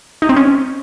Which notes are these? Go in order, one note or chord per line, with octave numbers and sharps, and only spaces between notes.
D#4
C4
C#4